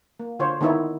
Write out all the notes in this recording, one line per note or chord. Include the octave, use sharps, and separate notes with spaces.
A#3
D3 F4 C5 C#5
D#3 B3 D#4 E4 C#5